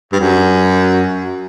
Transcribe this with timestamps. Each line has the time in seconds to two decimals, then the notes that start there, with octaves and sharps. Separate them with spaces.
0.12 G2
0.20 F#2